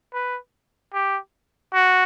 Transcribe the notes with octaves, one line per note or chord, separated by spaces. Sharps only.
B4
G4
F#4